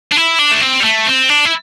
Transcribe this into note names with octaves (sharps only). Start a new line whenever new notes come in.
D4
E4
D4
A3
C4
G3
A3
C4
D4
E4